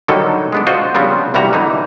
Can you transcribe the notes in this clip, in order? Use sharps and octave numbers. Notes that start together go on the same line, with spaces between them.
D3 D#3 F#3 G3 D#4 A4
G#3 B3 D4
F4 F#4 C5 D#5
C#3 F3 G3 B3 C4 D4
C2 E3 G3 F#4 A#5
D3 E3 D#4